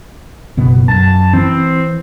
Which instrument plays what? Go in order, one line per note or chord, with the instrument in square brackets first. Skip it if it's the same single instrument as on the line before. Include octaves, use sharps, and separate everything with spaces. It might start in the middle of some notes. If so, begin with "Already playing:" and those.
[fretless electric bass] F#1 B2 B3
[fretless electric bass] F#2 [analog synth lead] A5
[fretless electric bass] E3 [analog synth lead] C4